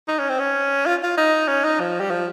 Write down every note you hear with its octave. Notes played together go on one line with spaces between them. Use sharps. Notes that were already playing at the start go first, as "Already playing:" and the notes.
D#4
C#4
C4
C#4
F4
F4
D#4
C#4
D#4
F3
G3
F3